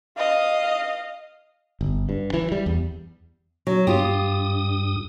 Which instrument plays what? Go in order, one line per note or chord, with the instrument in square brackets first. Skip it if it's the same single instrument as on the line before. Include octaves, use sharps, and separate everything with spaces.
[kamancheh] D#5 F5
[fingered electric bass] G1
G2
E3
G3
E2
[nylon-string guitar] F#3
[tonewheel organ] G2 D#6 [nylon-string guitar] F4 G4